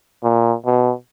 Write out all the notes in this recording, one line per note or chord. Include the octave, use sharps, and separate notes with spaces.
A#2
B2